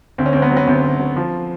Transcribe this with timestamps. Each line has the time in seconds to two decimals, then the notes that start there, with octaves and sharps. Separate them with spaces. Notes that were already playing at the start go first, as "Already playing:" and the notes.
0.18 D2 C4
0.26 C#4
0.33 D2 C4
0.42 B3
0.51 F#3
0.57 B3
0.67 D2 C4
0.83 D2
0.99 F#3
1.16 F3